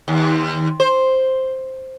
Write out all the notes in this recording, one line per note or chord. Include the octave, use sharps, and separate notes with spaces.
D#2
C5